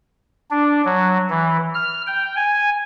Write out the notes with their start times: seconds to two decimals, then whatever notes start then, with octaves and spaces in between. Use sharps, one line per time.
0.51 D4
0.85 F#3
1.30 E3
1.74 F6
2.07 G5
2.36 G#5